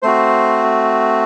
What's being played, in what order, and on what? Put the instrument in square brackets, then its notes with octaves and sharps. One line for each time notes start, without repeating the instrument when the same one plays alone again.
[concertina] A3 C4 F#4 C5